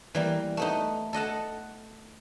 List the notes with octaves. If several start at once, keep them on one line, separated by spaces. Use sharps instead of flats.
E3 G3 A#3
A3 B3 D#4
A4 D#5 F#5 A5